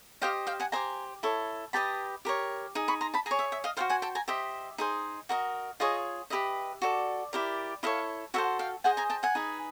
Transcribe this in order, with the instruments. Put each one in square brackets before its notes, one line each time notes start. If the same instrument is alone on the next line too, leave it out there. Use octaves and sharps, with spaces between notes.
[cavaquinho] G4 C5 D#5 F5 G5
F5 G5
F#5 G#5
G4 C5 D#5 G#5 A#5
E4 A4 C#5
G4 B4 D#5 A5 B5
G4 A#4 C#5
D#4 G#4
B5 C#6
A#5 C6
A5 B5
G#4 G#5 A#5
C#5
E5
E5
D#5 F5
F#4 A4 C5 F5 G5
F#5 G#5
G5 A5
G#5 A#5
G4 C5 D#5 E5
D#4 G#4 C5
F#4 A#4 D#5
F4 G#4 C#5 D#5
G4 B4 D#5 E5
F#4 A4 D5
E4 G4 A#4 D5
E4 A4 C#5 D#5 F5
F#4 A4 C5 E5 F#5
F5 G5
G#4 C5 D#5 F#5 G#5
G#5 A#5
G5 A5
F#5 G#5
D#4 G#4 B4